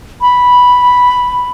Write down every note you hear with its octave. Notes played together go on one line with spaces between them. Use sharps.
B5